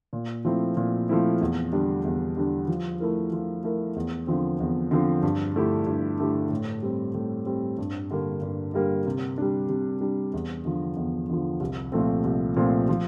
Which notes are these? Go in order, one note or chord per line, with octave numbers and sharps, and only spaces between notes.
A#2
F3 A3 C4 E4
A#2
F3 A3 C4 E4
E2
D3 G3 D4
E2
D3 G3 D4
F3
A3 E4 A#4
F3
A3 E4 A#4
E2
D3 F3 C4
E2
D3 F3 C4
G2
D3 A3 E4 G4
G2
D3 A3 E4 G4
A2
G3 C4
A2
G3 C4
G2
D3 G3 A#3
G2
D3 G3 A#3
C3
G3 D4
C3
G3 D4
E2
D3 F3
E2
D3 F3
C2
A#2 F3 A3 C4
C2
A#2 F3 A3 C4
F3